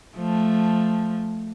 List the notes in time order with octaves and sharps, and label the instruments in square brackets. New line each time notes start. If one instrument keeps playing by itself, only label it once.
[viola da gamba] F3 A3